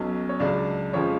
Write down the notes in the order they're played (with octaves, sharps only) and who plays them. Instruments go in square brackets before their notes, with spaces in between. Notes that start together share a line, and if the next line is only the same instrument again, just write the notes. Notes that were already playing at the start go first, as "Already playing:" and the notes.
Already playing: [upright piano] B1 B2 F#3 C#4
C#5
C#2 C#3 F#3 D4 D5
F2 F3 G#3 C#4 C#5